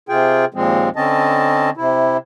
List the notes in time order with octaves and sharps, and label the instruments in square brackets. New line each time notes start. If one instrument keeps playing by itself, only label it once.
[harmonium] C3 F4 G#4 G5
D#2 A#2 F3 G#3 C4
D3 C4 C#4 D#5 A5
C3 E4